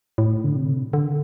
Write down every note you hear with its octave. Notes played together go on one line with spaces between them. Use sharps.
A2
D3
C3
D3